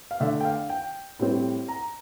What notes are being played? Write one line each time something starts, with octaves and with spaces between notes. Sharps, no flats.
F5
D3 A3 D4 E5
G5
F5
G5
A2 G3 C4
A#5